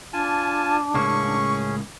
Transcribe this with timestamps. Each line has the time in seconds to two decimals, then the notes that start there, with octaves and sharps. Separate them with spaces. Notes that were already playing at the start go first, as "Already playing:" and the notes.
0.13 D4 F4 G#5 A5
0.94 C#2 A2 A#3 C#4 G#4 C#6